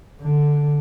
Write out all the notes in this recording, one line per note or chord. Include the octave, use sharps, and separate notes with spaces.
D3